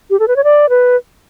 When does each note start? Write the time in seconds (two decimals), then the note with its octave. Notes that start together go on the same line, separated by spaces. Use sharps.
0.10 G4
0.20 A4
0.28 B4
0.36 C#5
0.44 D5
0.69 B4